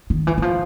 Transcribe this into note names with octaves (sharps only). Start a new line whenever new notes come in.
D#3
E3
E3
F3